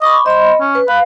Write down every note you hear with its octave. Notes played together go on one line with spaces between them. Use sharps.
D#5 B5 C#6 D6
C5 D#5 B5
C#4
B4
B4 F5